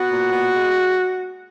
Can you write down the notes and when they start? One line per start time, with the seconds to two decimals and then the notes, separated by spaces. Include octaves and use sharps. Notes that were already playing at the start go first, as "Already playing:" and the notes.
Already playing: B3 F#4
0.08 A#2
0.31 B3
0.54 G#3